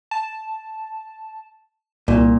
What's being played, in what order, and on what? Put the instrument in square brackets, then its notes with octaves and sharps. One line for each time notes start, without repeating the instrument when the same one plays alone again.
[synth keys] A5
[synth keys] C2 [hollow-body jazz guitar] A#2